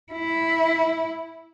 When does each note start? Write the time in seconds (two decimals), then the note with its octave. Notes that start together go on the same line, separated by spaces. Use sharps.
0.12 E4